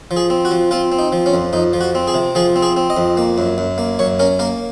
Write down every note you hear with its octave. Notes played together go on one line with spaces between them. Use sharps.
F3
G#4
C4
F#4
F3
C4 F4
C4
D#4
F3
C#4
F2
F2 D#4
F3
F#4
C4
G#4
C3
F3 G#4
C4
G#4
C4
D#5
F2
A#3
F#2
F#2
A#3
F#2 C#5
C#4 A#4
A#3 A#4